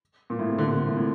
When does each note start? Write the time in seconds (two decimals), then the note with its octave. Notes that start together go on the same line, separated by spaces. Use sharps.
0.30 A#2
0.39 A2
0.49 C3
0.58 D3
0.67 A#2
0.73 C3
0.86 A2
0.97 A2